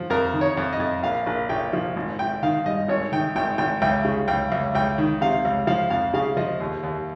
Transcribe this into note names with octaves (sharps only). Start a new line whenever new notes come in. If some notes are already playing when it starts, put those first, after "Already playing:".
Already playing: F3
F2 A#4
D#3
C#5
F2
D#5
F2
A#1 F5
A#1
A#1 G5
F3
G#1
G#1 G5
D#3 F5
G2 D#5
G#1 C#5
D#3 G5
G#1 G5
G#1 G5
C#2 G5
C#3
C#2 G5
C#2
C#2 G5
D#3
C3 F5
C#2
F3 F5
F2 F5
C#3 F5
F3 D#5
D#2
D#2